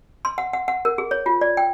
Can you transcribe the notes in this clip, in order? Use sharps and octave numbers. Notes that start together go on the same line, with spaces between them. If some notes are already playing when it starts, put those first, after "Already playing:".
C6
F#5
F#5
F#5
A#4
G#4
C#5
F4
D5
G5